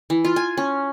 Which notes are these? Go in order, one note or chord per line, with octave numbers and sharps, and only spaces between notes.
E3
F4
G#5
C#4